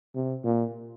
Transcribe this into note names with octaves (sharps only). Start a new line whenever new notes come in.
C3
A#2